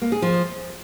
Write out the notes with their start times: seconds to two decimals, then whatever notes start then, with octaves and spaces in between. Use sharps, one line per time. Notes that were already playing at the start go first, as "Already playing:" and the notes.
0.02 A#3
0.12 G#4
0.22 F3